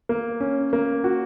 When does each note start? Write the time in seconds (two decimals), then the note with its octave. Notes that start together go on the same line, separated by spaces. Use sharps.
0.09 A#3
0.40 C#4
0.73 A#3
1.04 F#4